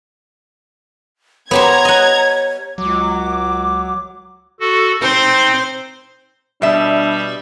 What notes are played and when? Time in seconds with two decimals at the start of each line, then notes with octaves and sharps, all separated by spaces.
1.51 B3 G4 C5 C#5 A#5 G#6
1.85 D#5 F#5
2.78 C#2 F#3 D6
4.60 F#4 A4
5.01 C4 D#4 C5
6.62 B2 G3 D4 E5